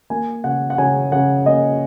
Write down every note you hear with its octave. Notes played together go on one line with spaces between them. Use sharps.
A#3 G#5
C#3 F#5
F#5
C#3 G#5
C#3 F#5
A#3 D#5